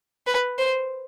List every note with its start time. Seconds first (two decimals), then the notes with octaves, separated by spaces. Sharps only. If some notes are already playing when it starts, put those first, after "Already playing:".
0.27 B4
0.59 C5